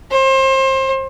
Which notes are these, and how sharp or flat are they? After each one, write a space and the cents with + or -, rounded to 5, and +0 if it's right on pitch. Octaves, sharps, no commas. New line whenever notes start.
C5 +30